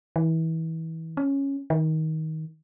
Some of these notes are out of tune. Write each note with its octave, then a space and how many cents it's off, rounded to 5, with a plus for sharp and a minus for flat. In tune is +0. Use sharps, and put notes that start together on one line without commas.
E3 -30
C#4 -5
D#3 +20